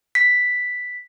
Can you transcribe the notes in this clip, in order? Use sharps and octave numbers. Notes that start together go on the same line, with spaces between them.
B6